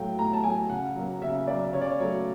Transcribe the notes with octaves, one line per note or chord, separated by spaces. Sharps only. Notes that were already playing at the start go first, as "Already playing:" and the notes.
Already playing: A2 F#3 A3 F5 G5
A2 A#5
A5
F#3 A3 G#5
C#3 F#5
F#3 A#3
C#3 E5
F#3 A#3 D5
C#3 C#5
D5
C#5
F#3 A3 C#5